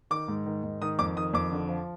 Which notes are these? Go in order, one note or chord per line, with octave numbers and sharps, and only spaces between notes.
D#3 D6
G#2
D#3
G#2
D#3 D#6
F2 D6
D#3 D#6
F2 D6
D3
F3